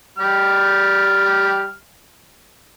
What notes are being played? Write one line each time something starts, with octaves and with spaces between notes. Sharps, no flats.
G3 G4 F6